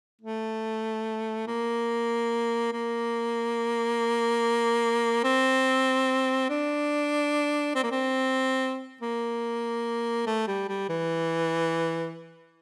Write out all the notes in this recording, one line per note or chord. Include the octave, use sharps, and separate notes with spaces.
A3
A#3
A#3
C4
D4
C4
A#3
C4
A#3
A3
G3
G3
E3